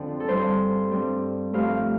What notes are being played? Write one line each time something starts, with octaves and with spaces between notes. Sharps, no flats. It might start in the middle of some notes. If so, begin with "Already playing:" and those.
Already playing: F2 D3 F3 C4
A4
G2 G3 C4 C5
G2 G3 C4
G2 F3 A3 C4 F5